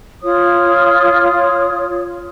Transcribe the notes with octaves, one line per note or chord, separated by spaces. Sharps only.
F4 C#5 D#6